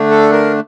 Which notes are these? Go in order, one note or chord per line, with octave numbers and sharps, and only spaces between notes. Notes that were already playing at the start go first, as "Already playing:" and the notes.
Already playing: D3 A3 D4
A4
A#4